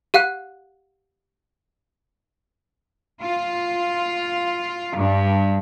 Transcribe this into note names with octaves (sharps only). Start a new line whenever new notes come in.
G4 F5 F#5 F#6
F4
G2